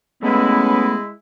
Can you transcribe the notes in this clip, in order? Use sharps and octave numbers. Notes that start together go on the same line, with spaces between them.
G#3 A3 B3 C#4 E4 B4